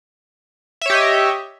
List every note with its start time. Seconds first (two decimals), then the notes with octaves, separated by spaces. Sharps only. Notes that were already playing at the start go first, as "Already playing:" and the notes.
0.81 E5
0.86 C#5
0.90 G4
0.94 D#5